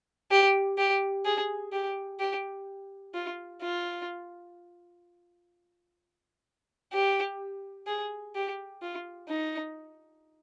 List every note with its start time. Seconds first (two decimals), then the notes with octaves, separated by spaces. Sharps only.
0.31 G4
0.78 G4
1.25 G#4
1.72 G4
2.20 G4
3.14 F4
3.62 F4
6.93 G4
7.87 G#4
8.35 G4
8.82 F4
9.29 D#4